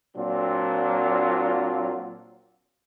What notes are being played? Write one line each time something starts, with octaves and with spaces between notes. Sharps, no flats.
A#2 F#3 C4 D4 F4